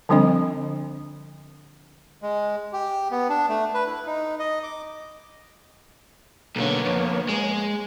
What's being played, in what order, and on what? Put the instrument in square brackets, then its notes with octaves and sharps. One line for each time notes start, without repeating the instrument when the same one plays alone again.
[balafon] D3 F3 G3 C4 D4 D#5
[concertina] G#3
G4
B3
D4
A3
B4
E4
D#4
D#5
D6
[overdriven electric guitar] B1 D3 [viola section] A#3 B3 C#5
[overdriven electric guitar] F2
G#3